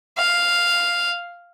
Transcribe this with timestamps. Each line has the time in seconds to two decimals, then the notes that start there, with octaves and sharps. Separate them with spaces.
0.18 F5